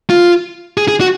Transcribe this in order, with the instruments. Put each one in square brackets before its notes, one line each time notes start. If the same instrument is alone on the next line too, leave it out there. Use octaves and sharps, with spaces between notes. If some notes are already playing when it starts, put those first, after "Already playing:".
[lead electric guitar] F4
G#4
G#4
F#4